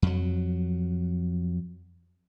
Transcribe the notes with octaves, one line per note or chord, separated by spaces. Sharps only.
F2 F#3